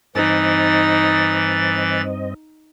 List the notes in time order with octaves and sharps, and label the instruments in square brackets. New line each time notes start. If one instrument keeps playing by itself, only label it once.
[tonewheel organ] G2 C4 D#5 [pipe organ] E3 A6 [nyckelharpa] D#4